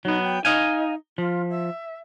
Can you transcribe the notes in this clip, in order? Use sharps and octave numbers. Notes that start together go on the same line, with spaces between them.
F#3 B3 D#4
G5
D#4 D#5 F5 G#5
F3 F4
E5